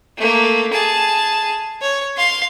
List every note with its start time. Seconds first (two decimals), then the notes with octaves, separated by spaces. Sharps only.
0.17 A3 A#3
0.73 G#4 A5
1.81 C#5
2.17 F5 C6